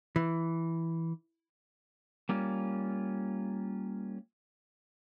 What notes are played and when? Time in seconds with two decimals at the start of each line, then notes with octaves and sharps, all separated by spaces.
0.16 E3
2.29 G3 A#3 C#4 F4